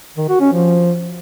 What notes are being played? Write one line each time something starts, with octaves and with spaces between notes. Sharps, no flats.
D#3
F#4
C#4
F3